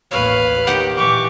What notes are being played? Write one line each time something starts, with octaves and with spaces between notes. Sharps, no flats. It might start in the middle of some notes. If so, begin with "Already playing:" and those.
A1 D#2 B4 C#5 F5
D#3 G4 F#5
A#2 E3 G4 C#6 D6